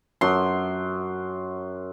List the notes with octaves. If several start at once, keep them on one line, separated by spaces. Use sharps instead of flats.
F#2 C6